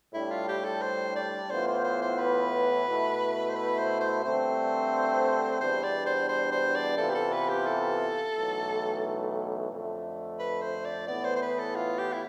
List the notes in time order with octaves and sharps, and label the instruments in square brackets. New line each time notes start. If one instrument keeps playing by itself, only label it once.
[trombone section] A2 G3 D4 [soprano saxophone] E4
[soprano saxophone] F4
G4
A4
C5
D5
[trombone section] A2 E3 B3 F4 [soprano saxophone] C5
[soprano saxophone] C5
C5
C5
B4
[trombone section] B2 A3 E4
[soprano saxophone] C5
B4
C5
C5
[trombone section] G2 D3 A3 C4 [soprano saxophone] C5
[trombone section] E2 B2 G3 D4 [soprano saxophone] C5
[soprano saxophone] D5
C5
C5
C5
D5
[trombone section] C3 E3 B3 F4 [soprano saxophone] A4
[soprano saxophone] G4
A4
B4
G4
A4
[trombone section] B1 A2 E3 A3
F2 D3 A3
[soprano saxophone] B4
C5
D5
[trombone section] A2 E3 B3 [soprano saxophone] D5
[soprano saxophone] C5
C5
B4
A4
F4
G4
E4